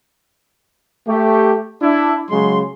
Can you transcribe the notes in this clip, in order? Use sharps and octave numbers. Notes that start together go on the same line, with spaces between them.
A3 G4
D4 E4
C#3 F#3 G#3 C6